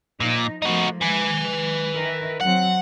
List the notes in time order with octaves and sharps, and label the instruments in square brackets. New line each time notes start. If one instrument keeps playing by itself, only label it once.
[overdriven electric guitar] A#2 [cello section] F3 D#4
[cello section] F3 A3 A#3 [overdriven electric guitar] D#4 F#4
[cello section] G#3 [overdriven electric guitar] B4 G#5
[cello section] D#3 A#4 E5
[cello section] F#3 C4 [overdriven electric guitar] F#5